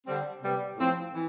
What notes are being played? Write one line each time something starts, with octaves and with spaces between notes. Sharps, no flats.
D3 G3 C4
C3 G3 B3
A2 F3 C4
E3